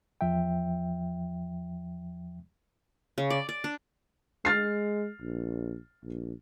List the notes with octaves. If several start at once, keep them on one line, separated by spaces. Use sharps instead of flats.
E2 F3 E5 G5
C#3
D5
D5
D4
G#3 F6 A6 C7
A#1
A#1